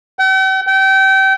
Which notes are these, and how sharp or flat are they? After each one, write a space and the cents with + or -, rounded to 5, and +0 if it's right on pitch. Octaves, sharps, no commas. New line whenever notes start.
G5 -45
G5 -30